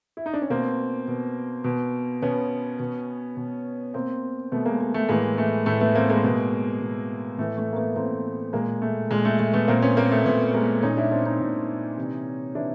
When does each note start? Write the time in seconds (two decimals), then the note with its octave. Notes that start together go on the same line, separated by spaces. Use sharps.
0.17 E4
0.26 D#4
0.33 D4
0.42 C#4
0.50 B2 A#3 C4
1.08 B2
1.64 B2
2.22 B2 B3 C#4
2.79 B2
3.37 B2
3.94 B2 A#3 C4
4.52 B2 A3 B3
4.65 G#3 A#3
4.81 G#3
4.94 A3
5.09 A2 E3 G#3 A#3
5.38 A3
5.66 A2 E3 A3
5.81 A3 B3
5.95 A#3 C4
6.09 G#3 A#3
6.24 B2
6.81 B2
7.38 A2 E3 A3
7.58 A3
7.73 A#3
7.77 A3 B3
7.96 A2 E3 A#3 C4
8.53 A#2 G#3 A#3
8.82 A3
9.11 A#2 G#3
9.25 A3
9.39 A3
9.53 A3 B3
9.68 A#2 A#3 C4
9.82 B3 C#4
9.96 A#3 C4
10.11 A3 B3
10.25 A#2 A3 B3
10.54 G#3 A#3
10.83 A#2 C#4 D#4
10.97 D4 E4
11.12 C4 D4
11.26 C#4 D#4
11.40 A#2
11.98 C3 E3
12.55 C3 E3 D4 E4